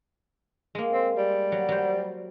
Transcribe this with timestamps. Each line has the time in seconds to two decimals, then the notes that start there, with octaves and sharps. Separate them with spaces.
0.75 G#3 A#3
0.93 C4
1.17 G3
1.52 F#3
1.69 F#3 C5